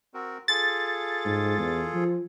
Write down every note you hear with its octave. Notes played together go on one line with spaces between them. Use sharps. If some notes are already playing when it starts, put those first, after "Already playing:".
C4 F#4 A#4
F4 G#4 A4 A6
G#2
E2
F3